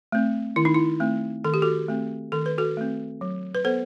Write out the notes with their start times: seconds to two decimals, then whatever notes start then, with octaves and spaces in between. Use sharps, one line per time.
0.12 A3 C4
0.56 D#3 E4
0.65 D#4
0.74 E4
1.00 A3 C4
1.44 D#3 A4
1.54 G4
1.62 F#4 A4
1.88 A3 C4
2.32 D#3 A4
2.46 B4
2.58 F#4 A4
2.77 A3 C4
3.21 F#3
3.55 B4
3.65 B3 A4 C5